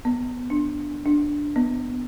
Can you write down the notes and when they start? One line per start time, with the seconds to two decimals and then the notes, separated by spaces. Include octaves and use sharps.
0.05 B3
0.50 D4
1.06 D4
1.56 B3